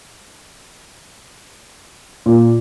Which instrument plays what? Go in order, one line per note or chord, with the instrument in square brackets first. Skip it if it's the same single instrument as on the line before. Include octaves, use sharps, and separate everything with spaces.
[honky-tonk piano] A#2